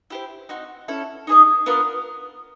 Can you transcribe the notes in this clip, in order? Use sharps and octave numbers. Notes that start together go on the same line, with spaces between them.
E4 G4 C5
C4 D#4 F#4
C#4 E4 A4
D#4 G#4 C5 D#5
B3 D4 F4 A#4